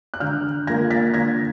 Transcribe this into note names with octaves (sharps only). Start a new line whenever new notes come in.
F#6
D3 F6 G6
F3 A#3 G#6 A#6
A6 B6
D3 G#6 A#6